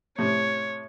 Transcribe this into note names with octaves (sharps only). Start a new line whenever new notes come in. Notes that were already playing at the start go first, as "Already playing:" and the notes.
A2 C3 C#5